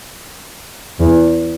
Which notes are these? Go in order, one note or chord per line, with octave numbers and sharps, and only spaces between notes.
E2